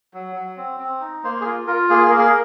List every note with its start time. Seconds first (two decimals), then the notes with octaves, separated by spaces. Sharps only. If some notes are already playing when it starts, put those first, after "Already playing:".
0.14 F#3
0.36 F#3
0.57 C4
0.80 C4
1.01 D#4
1.24 A#3 C5
1.41 G#4
1.45 F4 A#4
1.67 F4 A#4
1.90 A#3 G#4
2.01 G#4
2.10 A#3 A#4
2.19 G#4
2.29 A#4